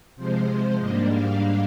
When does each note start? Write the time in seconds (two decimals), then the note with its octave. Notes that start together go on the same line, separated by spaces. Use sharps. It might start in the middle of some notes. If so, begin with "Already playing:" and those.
0.16 C3 F3 G#3 C5
0.79 G#2 G3 A#3 D4 D#5
1.12 F5